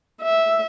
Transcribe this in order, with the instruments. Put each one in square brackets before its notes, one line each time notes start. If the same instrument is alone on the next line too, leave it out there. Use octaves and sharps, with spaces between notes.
[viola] E5